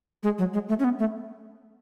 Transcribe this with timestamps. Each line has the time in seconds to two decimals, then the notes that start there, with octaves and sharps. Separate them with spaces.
0.23 G#3
0.38 F#3
0.54 G#3
0.69 A3
0.79 C#4
0.84 B3
0.99 A3